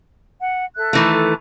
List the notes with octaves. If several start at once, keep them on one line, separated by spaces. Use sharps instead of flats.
F#5
A4 E5 F#6
D#3 E3 A3